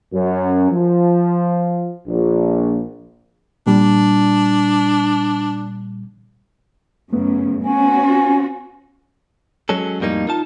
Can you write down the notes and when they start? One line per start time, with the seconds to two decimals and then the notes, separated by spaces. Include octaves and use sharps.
0.13 F#2
0.71 F3
2.07 A#1
3.67 A#2 G3 D4
7.13 F#2 C#3 A3 B3
7.65 C4 C#4 F#4 G#5
9.69 F#3 G#3 C#4 A4
10.00 F2 A2 G3 A#3 D#4
10.28 D#4 F4 A5